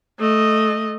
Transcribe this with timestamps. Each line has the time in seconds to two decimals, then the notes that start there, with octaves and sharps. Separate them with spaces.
0.20 A3 D#5